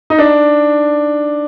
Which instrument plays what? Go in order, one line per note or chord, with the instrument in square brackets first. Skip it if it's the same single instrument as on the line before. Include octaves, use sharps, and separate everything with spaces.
[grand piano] D#4
D4